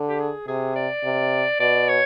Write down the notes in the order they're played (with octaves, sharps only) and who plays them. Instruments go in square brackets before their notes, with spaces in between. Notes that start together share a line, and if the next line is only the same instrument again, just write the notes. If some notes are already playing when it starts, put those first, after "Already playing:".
Already playing: [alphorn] D3
[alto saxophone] G4
G#4
[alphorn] C3 [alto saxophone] G#4
[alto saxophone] D5
[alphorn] C3
[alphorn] B2 [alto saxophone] D5
[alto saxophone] C#5